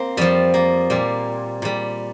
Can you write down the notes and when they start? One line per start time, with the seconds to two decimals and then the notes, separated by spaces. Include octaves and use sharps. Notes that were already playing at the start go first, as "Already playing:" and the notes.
Already playing: A#3 C4
0.17 F2 F3 G3
0.54 A#3
0.90 A#2 G3
1.62 A#2 G3